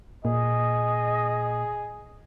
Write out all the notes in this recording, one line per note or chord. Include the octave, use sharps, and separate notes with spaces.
A#2 G#4 D#5